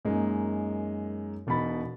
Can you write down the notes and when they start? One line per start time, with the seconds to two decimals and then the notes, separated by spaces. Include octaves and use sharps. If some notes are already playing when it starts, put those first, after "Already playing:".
0.05 F#2 G#3 A#3 D#4
1.47 E1 B2 D#4 B5 A6